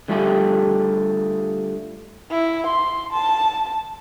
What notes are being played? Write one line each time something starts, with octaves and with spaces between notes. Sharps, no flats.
D3 G3 A3 F4 G4 G#4
E4
C6
A5